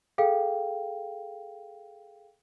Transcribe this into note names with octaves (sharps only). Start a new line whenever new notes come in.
G#4 A4 F5 G5